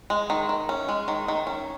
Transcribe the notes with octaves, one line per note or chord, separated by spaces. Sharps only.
G#3
D#3
D#3
C#4
G#3
D#3
D#3
C#4